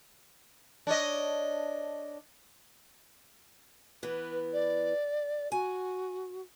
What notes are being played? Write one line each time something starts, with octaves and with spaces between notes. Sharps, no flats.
D4 C#5 D#5
E3 B3 B4
D5
F#4 G#5